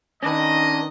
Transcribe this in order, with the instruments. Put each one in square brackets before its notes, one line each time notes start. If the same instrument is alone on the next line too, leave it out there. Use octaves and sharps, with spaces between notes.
[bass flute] D#3 [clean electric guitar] C#4 D4 B4 [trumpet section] D#5